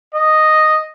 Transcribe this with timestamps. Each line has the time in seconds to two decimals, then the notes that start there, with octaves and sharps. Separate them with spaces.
0.15 D#5